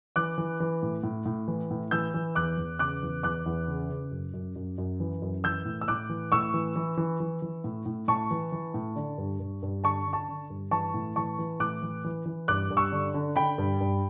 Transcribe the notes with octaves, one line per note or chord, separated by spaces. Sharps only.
E3 D6 F#6
E3
E3
A2
A2
A2
E3
A2
E3 E6 G6
E3
E2 D6 F#6
E2
C#3 D6 F#6
E2
E2 D6 F#6
E2
C#3
C#3
F#2
F#2
F#2
F#2
E3
F#2
E3 E6 G6
A2
E6
A2 D6 F#6
E3
A2 C#6 E6
E3
E3
E3
E3
E3
A2
A2
A2 A5 C#6
E3
E3
A2
D3
G2
G2
G2
D3 A5 C#6
D3
A5 C#6
D3
G2
E3 A5 C#6
A2
E3 A5 C#6
E3
A2 D6 F#6
E3
E3
E3
G2 D6 F#6
G2
C#6 E6
D3
D3
D3 G5 B5
G2
G2